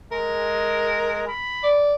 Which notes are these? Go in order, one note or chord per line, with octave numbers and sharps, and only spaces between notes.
G#3 A#4
B5
D5